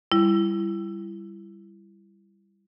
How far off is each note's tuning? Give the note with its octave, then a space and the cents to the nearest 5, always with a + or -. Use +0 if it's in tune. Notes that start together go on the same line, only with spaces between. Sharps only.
G3 +0 E4 +25